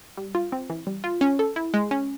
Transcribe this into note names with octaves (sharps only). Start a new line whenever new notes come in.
G3
F4
C4
E3
G3
F4
C#4
A4
E4
G#3
C#4